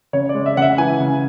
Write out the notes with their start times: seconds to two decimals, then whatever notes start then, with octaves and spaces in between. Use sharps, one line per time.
0.13 C#3 C#5
0.29 D5
0.35 G#3
0.46 E5
0.57 C#3 F#5
0.62 E5
0.78 E3 G#5
1.00 C#3